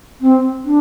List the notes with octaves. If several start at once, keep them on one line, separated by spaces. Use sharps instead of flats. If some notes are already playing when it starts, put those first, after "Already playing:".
C4
D4